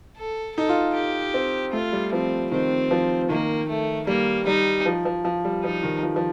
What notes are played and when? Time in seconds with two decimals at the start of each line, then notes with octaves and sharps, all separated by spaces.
0.17 A4
0.56 D#4 A4
0.69 F4
0.95 G4
1.34 C4
1.73 A3 F4
1.92 G3
2.12 F3 C4
2.51 D#3 C4
2.91 F3
3.29 D#3 A#3
3.69 A3
4.07 G3 A#3
4.47 G3 D#4
4.86 F3
5.05 F3
5.25 F3
5.44 G3
5.64 F3 D#4
5.83 D#3
6.03 F3
6.16 F3